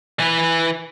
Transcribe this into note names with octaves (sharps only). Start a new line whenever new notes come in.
E3 B4